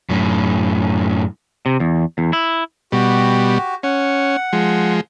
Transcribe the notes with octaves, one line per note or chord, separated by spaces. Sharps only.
F#2 A2
C3
E2
E2
E4
B2 G3 F#4 G4
C#4 F#5
F3 G#3